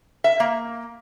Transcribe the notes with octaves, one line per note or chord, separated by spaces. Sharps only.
E5
A#3